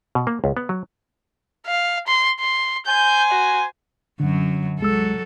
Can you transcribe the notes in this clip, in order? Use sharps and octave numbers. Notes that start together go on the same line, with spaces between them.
B2
A#3
C#2
B3
F#3
F5
C6
C6
C5 G#5 G6
F#4
F#2 D3 F#3
C2 F#3 G#3 A4 E6